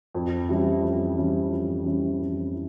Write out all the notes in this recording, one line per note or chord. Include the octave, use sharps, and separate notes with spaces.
F2
E3 G3 C#4 E4
F2
E3 G3 C#4 E4
F2
E3 G3 C#4 E4
F2
E4